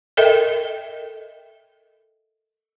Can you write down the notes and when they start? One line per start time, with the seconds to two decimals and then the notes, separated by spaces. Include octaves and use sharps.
0.17 A4 A#4 D#5 E5 G5